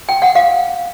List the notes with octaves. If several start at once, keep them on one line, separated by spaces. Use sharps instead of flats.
G5
F#5
F5